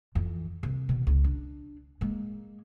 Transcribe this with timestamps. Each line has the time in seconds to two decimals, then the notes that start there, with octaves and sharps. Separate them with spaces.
0.15 F2 E3
0.63 C2
0.89 B2 D#3
1.07 C#2
1.24 D4
2.01 G#3 A#3